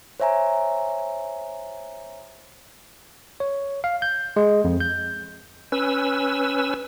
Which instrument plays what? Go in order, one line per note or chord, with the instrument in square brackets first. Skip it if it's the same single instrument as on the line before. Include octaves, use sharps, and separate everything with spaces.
[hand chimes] C5 C#5 E5 G#5 A#5
[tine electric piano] C#5
F5
G6
G#3
F2
G6
[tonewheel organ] C#4 B4 E6